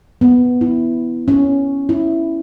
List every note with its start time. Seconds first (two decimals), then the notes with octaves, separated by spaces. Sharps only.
0.21 B3
0.61 E4
1.28 C#4
1.89 E4